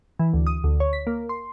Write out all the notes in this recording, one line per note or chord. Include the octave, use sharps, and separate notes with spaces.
E3
D2
D#6
D2
C#5
B6
A#3
C6